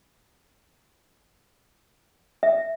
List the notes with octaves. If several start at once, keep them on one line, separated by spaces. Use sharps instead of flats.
E5